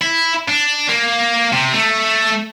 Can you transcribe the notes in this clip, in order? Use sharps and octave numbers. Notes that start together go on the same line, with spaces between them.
E4
D4
A#3
C3
A3